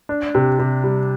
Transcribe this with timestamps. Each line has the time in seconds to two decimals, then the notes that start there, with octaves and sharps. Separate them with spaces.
0.09 D4
0.35 C3
0.59 C3
0.84 G3